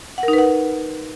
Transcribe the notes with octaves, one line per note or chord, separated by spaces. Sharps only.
F#5
A#4
D#4
B4
F#5